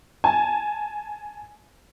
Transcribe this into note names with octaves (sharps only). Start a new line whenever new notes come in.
G#5 A5